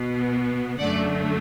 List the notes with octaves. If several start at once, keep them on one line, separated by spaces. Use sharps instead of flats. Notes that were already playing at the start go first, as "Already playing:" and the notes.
Already playing: B2 B3
F#2 D3 A3 D5 F#5